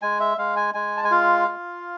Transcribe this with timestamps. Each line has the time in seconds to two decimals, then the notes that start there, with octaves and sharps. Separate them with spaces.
0.02 G#3 G#5
0.20 E5
0.38 G#3 F5
0.56 G#5
0.74 G#3 G#5
0.97 A5
1.04 G#5
1.11 F4 F5
1.48 F4